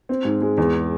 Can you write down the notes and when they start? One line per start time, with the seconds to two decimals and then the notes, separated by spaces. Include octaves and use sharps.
0.09 C4
0.25 G#2
0.42 G#3
0.57 E2